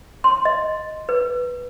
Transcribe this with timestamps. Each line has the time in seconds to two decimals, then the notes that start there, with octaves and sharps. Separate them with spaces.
0.24 C6
0.45 D#5
1.09 B4